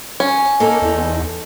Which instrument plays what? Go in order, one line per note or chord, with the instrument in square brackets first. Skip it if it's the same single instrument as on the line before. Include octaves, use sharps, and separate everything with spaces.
[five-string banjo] C#4
[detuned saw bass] A#3 [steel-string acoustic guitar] D#4 A4
[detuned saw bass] E2